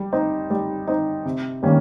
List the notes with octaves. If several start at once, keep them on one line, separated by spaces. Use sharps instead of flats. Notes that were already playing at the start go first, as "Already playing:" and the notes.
Already playing: G3
C4 D#4
G3
C4 D#4
C3
D#3 G3 A#3 C#4